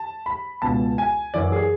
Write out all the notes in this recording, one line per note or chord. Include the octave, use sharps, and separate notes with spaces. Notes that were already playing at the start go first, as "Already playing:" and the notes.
Already playing: A5
B5
C#2 B2 A5
G#5
F#2 E3 D5
G#4